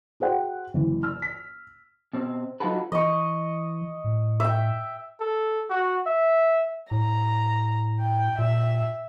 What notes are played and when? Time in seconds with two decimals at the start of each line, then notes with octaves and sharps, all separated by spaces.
0.20 F#4 G#4 C5 F#5 G5
0.74 F#1 E3
1.03 E6 F6
1.22 B6
2.13 B2 C4
2.60 F#3 D#4 F4 F#4 A4 B4
2.92 E3 D#5 C#6
4.04 A2
4.40 E5 G5
5.20 A4
5.70 F#4
6.06 E5
6.91 A2 A#5
8.00 G5
8.39 A#2 E5